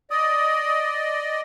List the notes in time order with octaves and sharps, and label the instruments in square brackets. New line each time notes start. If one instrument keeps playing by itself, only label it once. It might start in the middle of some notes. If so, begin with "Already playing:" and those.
[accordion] D5 D#5 [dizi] D#6